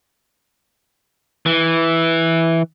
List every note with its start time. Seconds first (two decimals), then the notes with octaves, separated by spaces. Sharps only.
1.46 E3